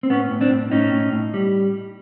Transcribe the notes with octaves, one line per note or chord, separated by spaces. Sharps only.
C4
A2 B3 C#4
A2
C4 D4
A2
A2 C#4 D#4
A2
A2
G3